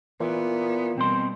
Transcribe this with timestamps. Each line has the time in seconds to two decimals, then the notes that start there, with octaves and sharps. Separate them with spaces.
0.20 A#2 E3 B3
0.98 B2 G3 C4 C6